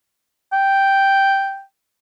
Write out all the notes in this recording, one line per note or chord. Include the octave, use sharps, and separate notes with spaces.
G5